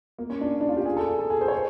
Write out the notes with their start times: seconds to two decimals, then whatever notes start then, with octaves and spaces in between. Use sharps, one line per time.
0.18 A#3
0.30 C#4
0.41 D4
0.61 D4
0.69 F4
0.77 G4
0.86 G#4
0.97 A4
1.19 A4
1.30 G#4
1.41 C5
1.48 C#5
1.52 C5